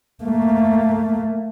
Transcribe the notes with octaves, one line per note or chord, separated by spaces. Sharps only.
A3 A#3